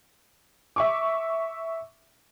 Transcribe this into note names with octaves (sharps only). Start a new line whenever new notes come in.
E5 C#6 D6